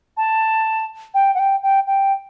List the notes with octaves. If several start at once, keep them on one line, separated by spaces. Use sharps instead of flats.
A5
G5
F#5
G5
G5
G5